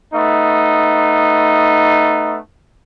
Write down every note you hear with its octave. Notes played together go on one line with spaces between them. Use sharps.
A3 B3 D#4